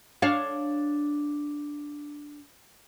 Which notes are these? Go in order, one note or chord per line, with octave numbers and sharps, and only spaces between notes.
D4 C#5 F5